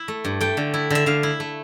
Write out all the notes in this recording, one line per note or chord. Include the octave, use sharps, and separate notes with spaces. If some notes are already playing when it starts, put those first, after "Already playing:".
Already playing: E4
A3
G2
A3 G5
D3
E4
D3 E5
D3 F5
E4
A3